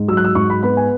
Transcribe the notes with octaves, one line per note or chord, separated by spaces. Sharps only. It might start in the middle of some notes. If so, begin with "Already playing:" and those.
Already playing: G#2
F#3 E6
F#6
E6
G#2 C#6
B5
B3 B5
G#5